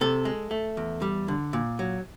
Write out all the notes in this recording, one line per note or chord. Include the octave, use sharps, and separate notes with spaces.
C3 A4
G#3
A3
E2
G3
D3
A#2
F#3